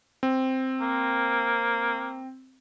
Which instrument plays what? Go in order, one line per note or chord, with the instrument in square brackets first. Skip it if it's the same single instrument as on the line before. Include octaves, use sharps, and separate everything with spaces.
[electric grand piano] C4
[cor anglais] A#3